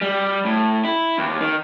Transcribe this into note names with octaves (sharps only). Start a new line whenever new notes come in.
G3
A2
E4
D#2
D#3